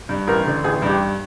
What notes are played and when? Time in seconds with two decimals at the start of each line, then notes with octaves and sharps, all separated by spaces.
0.09 G2
0.27 A1 A#4
0.45 D3
0.64 A1 G#4
0.82 G2
0.89 G4